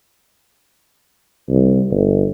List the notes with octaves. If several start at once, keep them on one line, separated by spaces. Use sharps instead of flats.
C2
G1